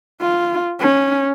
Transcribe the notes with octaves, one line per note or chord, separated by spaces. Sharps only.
F4
C#4